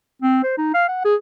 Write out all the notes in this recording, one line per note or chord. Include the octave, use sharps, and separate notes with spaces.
C4
C5
D#4
F5
F#5
G#4